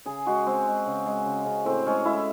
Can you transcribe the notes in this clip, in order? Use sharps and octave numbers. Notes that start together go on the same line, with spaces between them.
C#3 G#4
G#3 F#4
G#3 C4
G#3
C#3
G#3
C#3
C#3
A2 C4
G#3 C#4
G#3 E4